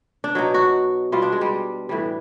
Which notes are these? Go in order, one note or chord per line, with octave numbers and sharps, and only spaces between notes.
D4
B2 F#3 D#4
F#4
B2 G3 F4
D4
G#3
G3
A2 E3 G3